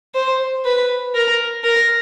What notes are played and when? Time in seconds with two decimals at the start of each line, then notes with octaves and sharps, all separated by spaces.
0.14 C5
0.65 B4
1.15 A#4
1.64 A#4